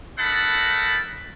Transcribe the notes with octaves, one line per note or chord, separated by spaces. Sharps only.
D#4 A4 A#4 F#5 A5 B5